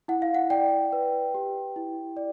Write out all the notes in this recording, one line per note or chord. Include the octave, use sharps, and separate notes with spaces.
E4 F#5
F5
F#5
D5 G5
B4
G4
E4
D5